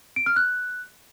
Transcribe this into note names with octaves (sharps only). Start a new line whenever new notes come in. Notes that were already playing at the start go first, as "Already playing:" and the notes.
D7
F6
F#6